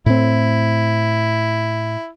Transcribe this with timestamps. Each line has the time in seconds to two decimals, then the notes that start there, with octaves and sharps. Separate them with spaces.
0.06 A2 C4 E4